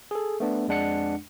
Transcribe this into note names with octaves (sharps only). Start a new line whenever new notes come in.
G#4 A4
A3 B3 D4
F2 G#3 D4 F#5 C#7